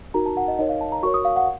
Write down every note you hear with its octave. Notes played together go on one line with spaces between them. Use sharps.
D#4 F#4 A#4 A#5
A5
F#5
D#5
D#4 A#4 C#5 D#5
F5
A5
A#5
F#4 A#4 C#5 C#6
D#6
F5
F#5